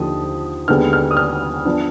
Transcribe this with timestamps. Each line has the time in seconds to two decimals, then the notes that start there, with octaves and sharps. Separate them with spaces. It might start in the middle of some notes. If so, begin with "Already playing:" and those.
Already playing: D#2 D3 F3 D#6
0.68 D#2 D3 G#3 B3 F6
0.93 F6
1.11 D#6
1.17 F6
1.65 F3 B3 D4